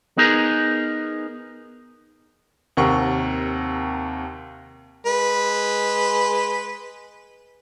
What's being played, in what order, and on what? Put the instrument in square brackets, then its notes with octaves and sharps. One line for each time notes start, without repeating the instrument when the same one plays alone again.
[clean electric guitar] B3 D#4 G#4 A#4
[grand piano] D#2 C3 A#4 F#5 C#6
[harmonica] G#3 B4